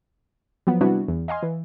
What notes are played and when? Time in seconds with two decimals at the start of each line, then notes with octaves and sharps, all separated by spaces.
0.67 F3 F#3 B3
0.81 C3 G3 B3 D4 E4 F#4
1.08 E2
1.28 D#5 F5 G#5 C6
1.43 E3